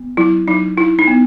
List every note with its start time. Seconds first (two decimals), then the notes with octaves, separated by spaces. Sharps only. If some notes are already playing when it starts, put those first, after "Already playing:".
Already playing: B3
0.17 F#3 E4
0.48 F#3 D#4
0.77 D#4 E4
0.99 D#4
1.07 B3